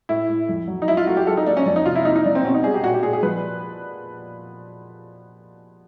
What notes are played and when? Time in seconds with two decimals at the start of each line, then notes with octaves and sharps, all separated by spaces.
0.09 A2 E4
0.29 A2
0.49 F2
0.67 F#3
0.82 D#4
0.88 F#3 E4
0.97 F4
1.07 A3 F#4
1.17 G4
1.27 F#3 A4
1.37 D#4
1.46 A#3 D4
1.57 C#4
1.66 F2 D4
1.76 D#4
1.86 C3 F4
1.95 E4
2.05 A#3 D#4
2.15 D#4
2.25 F3 D4
2.35 C4
2.44 B2 C#4
2.54 D#4
2.64 G3 G#4
2.74 G4
2.83 A#2 F#4
2.94 G4
3.03 A#2 G#4
3.13 G#4
3.23 F3 B4